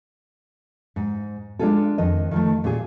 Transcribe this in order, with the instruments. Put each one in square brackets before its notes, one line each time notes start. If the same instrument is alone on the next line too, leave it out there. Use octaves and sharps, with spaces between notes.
[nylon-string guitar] G#2
G#3 D4 D#4 F4 G#4 A4
F2 D#3 D#5
D#3 F3 A3
A#2 G#4